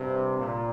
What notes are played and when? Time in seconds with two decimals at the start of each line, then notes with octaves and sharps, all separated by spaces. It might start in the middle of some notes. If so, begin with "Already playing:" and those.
Already playing: G2 C3
0.36 A#2